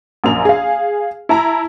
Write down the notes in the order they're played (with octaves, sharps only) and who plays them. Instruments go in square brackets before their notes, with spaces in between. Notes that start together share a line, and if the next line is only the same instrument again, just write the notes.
[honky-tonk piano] A#1 F#2 A#3 F7
G#4 F5
E4 A5 A#5